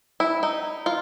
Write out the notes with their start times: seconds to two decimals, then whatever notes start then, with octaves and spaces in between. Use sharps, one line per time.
0.20 E4
0.43 D#4
0.86 F4